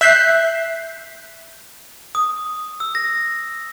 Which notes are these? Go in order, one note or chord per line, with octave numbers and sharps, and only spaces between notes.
E5 F#6 G6 B6 C7
D#6
E6
A#6